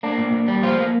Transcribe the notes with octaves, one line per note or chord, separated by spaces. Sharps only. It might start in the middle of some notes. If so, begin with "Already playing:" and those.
A#3 D4
A#2
A#2
G3
F3 F4
A#3